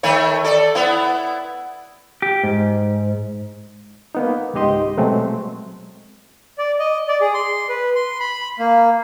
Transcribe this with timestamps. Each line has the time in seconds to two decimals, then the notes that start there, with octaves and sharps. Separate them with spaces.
0.03 D#3 A3 C#5
0.44 A4 D5
0.75 B3 E4
2.22 G4
2.43 G#2
4.15 A#3 B3 D#4
4.54 C#2 G#2 D#4 G4 D#5 C6
4.97 B2 F#3 G#3 A3 C4
6.58 D5
6.79 D#5
7.08 D5
7.21 G#4
7.34 C6
7.69 B4
7.95 C6
8.20 B5
8.59 A#3